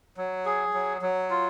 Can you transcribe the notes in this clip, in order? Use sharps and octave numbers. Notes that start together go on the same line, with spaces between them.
F#3
G#4
F#3
F#3
F4